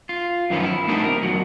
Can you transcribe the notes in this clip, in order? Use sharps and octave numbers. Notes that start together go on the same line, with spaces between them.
F4
F#2 D#3 F3 B3 C#4
E4
A3 B3 C4 D4 D#4 G4
A#4
E2 F#3